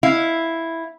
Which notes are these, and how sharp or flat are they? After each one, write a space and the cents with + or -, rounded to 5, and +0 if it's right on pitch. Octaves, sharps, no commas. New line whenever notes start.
E4 +0 F5 +0